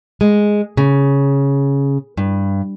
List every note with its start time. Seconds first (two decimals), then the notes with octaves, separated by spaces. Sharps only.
0.21 G#3
0.77 C#3
2.17 G2